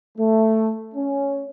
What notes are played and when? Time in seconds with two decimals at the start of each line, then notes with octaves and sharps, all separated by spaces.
0.18 A3
0.94 C#4